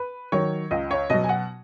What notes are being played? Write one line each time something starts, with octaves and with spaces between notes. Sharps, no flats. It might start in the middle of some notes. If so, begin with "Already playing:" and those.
Already playing: B4
D#3 F#3 C#5
C#2 D#5
C#5
B2 F#3 D#5
G#5
F#5